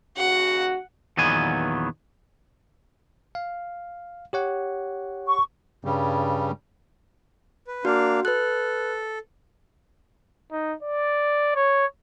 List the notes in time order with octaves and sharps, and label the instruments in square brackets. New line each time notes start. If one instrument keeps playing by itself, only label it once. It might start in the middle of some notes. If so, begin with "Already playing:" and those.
[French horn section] D#2 C#3 F#4 [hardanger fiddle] F#5
[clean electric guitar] E2 A#2 D#3 F#3 B3 G#5
[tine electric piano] F5
G4 C#5 F#5
[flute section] C#6
[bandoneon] G2 C#3 G3
[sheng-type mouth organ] B4
[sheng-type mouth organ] A#3 D4 F5 [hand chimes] F#4
[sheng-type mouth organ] A4 [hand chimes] B4 F#6
[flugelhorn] D#4
D5
C#5